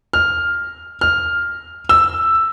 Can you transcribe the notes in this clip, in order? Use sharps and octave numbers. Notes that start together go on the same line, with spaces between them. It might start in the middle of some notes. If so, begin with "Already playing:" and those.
F6
F6
E6